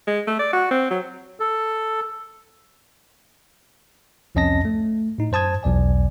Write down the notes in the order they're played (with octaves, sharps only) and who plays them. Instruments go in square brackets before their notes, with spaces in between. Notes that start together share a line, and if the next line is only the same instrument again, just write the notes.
[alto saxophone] G#3
A3
D5
F#4
C4
F#3
[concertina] A4
[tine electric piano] C2 F2 C#4 D#5 A5 A#6
A3
A2 D#4
F#2 C5 A5 D#6 G#6
B1 E2 D5 G#5